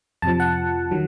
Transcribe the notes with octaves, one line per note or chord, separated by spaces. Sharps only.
F2 C3 F3 A5
F#5
D#3 F#3